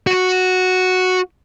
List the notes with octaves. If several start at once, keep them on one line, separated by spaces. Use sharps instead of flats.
F#4